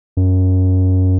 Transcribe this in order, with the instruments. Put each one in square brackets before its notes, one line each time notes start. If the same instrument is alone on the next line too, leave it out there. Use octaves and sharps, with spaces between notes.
[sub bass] F#2